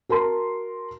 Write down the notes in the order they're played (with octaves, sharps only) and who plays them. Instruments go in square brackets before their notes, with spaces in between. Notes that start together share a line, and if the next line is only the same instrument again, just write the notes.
[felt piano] F#4 A#4 A5 C6